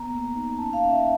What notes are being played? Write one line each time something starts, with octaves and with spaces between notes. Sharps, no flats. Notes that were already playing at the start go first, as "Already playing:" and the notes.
Already playing: B3 A#5
A#3
D#4
C#4 A5
F5
C#4
E5